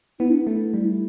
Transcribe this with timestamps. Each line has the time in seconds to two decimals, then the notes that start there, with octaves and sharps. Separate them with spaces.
0.20 B3 E4
0.30 D4
0.41 E4
0.47 A3
0.74 G3